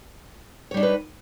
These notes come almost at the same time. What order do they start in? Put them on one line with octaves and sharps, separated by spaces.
C#5 G3 D4 D#4 B4